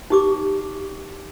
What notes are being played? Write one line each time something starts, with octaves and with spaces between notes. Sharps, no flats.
D#4 G4 D6